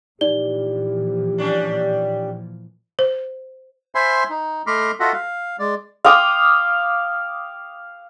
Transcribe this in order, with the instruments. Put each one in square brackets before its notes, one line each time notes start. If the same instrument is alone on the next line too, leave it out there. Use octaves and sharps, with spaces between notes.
[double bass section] A#2 E3 F3 [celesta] D#4 D5 G7 [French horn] G4
[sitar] G3 C#4 D4
[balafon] C5
[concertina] C5 E5 G#5 B5 C6
D#4
A3 D#5 B5 C6 D6 F6
F4 F#4 A4 D#5 E5 F#5
F5
G#3 D5
[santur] F5 G5 D6 D#6